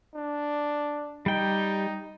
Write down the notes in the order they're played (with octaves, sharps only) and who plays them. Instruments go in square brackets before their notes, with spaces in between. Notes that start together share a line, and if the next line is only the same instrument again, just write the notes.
[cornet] D4
[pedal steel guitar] G3 G5 [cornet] D#4